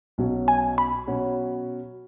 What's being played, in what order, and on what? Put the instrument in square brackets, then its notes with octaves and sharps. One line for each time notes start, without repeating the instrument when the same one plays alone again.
[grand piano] B1 B2 F#3 C#4 F#4
[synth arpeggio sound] G#5
B5
[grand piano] B2 F#3 C#4 F#4